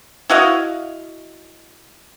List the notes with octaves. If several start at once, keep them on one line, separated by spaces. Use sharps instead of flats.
E4 F#4 D#5 F5